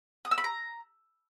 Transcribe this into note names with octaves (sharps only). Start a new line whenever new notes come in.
D#6
E6
B5
A#5